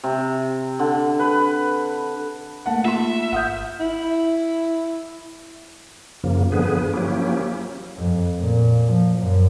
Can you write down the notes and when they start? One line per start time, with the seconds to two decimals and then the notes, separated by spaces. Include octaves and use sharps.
0.04 C3
0.79 D3
1.19 B4
2.66 A3 A#3 D#4 F#5 A5
2.85 F4 E5 C6
3.32 G#1 F#5 D#6 F6 G6
3.80 E4
6.24 F#2 C#3 F3 A#3
6.52 G2 D3 F3 B3 G#4 B4
6.93 F3 F#3 A#3 C#4 E4 G4
7.97 F2
8.39 A#2
8.84 F3
9.18 F#2